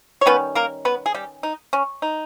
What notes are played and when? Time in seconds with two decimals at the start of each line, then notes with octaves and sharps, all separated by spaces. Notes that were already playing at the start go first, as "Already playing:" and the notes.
0.21 C#5
0.26 D#3 G3 B3 C#4 B4
0.55 A#3 A#4
0.85 B3 B4
1.06 G#4
1.14 G3 G4
1.43 D#4
1.73 C#4
2.02 D#4